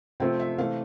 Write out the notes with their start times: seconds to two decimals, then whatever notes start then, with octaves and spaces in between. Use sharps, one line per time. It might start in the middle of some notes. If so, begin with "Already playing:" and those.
0.20 C3 F3 A3 C4 G5
0.40 E5
0.58 C3 E3 A3 F5